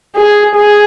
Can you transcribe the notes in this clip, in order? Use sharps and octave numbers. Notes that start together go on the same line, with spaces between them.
G#4
G#4